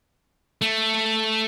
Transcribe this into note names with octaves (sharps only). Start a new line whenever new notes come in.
A3